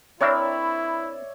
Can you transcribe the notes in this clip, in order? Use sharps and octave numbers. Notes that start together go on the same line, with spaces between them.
C4 D4 E4 A#4 C#5 D5 E5 B5